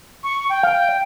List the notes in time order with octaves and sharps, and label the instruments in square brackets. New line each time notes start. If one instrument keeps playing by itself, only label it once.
[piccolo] C#6
G5
[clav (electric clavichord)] F5